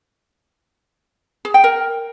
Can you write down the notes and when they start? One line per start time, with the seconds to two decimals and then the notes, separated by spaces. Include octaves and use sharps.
1.45 G#4
1.54 G5
1.64 A#4